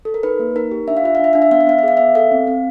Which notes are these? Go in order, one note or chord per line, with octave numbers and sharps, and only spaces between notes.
A4
A#4
D#4 B4
A#3
D#4 A#4
G4
D4 E5
F5
F4 E5
F5
D4 E5
D4 F5
E5
B3 F5
E5
B3 F5
E5
G#4 F5
B3 E5
A4 F5
C4
C4